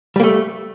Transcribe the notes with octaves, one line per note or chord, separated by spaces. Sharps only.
G3 A3 A#3